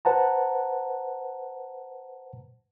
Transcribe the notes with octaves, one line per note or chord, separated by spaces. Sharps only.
B4 C5 F#5 A5 A#5